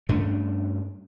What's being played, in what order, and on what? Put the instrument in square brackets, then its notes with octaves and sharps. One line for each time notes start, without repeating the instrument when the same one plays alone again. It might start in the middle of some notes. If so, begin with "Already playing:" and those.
[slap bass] G2 A3 C#4 D4